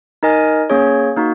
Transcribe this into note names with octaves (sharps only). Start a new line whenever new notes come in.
D#4 A#4 D#5 G#5
A#3 C#4 G#4 C#5
A#3 D#4 F#4